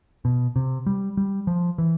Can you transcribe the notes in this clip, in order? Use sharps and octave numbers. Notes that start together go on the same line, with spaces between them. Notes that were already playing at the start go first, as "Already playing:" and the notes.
B2
C3
G3
G3
F3
E3